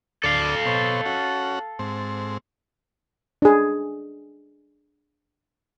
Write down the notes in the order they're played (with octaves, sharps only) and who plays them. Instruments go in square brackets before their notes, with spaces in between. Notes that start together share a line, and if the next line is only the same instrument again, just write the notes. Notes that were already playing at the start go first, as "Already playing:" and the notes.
[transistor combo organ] D2 D5 [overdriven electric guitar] A4 F5
[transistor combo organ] B2 C5 C#5
C#4 F#4
G#2 C4
[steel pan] D4 G#4